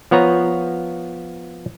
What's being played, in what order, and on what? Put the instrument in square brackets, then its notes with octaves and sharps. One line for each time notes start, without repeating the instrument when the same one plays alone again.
[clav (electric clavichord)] F3 B3 C#5 A#5